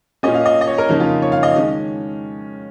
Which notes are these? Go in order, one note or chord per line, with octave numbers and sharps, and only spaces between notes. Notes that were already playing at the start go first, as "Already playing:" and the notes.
A#2 A#3 C#4 D#5
F5
D#5
D#5
C#5
A#4
F2 C#3 A#3 C#4 D#4
F4
C#5
F5
D#5
D#3 G#3 C#4